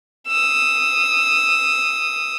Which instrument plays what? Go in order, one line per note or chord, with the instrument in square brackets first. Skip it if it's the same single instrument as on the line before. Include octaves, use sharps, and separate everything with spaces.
[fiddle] D#6 E6